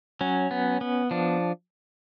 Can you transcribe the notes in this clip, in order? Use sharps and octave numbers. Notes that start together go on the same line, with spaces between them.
F#3 C#4
B3
B3
F3 D4